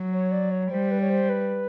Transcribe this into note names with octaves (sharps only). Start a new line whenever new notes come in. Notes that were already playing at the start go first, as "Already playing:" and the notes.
Already playing: F#3
C#5
D5
C#5
G3 C5
B4
C#5
C5
B4